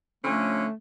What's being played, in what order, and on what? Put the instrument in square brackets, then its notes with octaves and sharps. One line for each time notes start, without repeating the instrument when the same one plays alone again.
[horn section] D3 F3 C#4 [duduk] A3